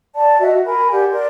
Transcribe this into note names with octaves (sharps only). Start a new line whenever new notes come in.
D5 A5
F#4 D#5 E5
F#4
A#4 G#5 B5
G4 D5 F#5 G#5
A#4 D5 C6